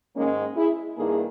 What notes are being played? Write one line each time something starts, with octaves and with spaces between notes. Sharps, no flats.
G#2 D#3 G#3 A#3 C#4
E4 G#4
G2 D#3 A#3 E4 G#4